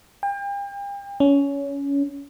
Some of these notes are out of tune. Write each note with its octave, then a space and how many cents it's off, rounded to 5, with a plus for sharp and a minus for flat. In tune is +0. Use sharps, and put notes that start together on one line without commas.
G5 +40
C#4 +20